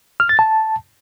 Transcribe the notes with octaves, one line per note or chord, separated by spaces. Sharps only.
F6
A6
A5